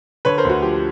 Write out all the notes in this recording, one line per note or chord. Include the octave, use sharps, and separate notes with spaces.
D3 B4 C#5
A#4 C5
D2
F#4
F3 G4